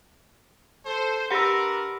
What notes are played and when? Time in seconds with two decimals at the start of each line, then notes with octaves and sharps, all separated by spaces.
0.86 A4 C5
1.31 D4 G4 A#4 B4 F#5 E6 A#6 C#7